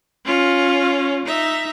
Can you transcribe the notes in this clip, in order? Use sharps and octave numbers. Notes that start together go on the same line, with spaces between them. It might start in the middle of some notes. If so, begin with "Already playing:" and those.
C#4 F4
D#4 E5